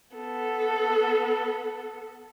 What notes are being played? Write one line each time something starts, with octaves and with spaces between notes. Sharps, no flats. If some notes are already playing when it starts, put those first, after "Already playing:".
B3 A4